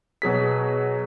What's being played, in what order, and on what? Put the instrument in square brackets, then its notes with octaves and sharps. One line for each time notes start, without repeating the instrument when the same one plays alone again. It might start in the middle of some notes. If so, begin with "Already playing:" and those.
[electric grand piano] B2 F#3 G#4 B6